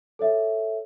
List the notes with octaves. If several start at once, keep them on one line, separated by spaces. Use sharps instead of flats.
A4 C#5 E5